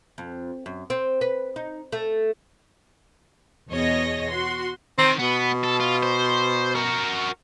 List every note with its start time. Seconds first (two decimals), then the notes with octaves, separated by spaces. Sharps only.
0.18 F2
0.66 F#2
0.90 C4
1.21 B4
1.56 D#4
1.92 A3
3.69 E2 B2 G#4 C#5 D#5 A#6
4.30 F#4 C6
4.99 D#3 C4
5.19 B2 B3
5.64 A4
5.80 F4
6.03 C5
6.75 F#4 A#4